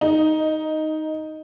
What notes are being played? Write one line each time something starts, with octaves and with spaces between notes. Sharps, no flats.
D#4